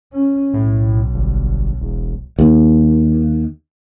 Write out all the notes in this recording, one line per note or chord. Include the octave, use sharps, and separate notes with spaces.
C#4
B1 A2
G1
E1
D#2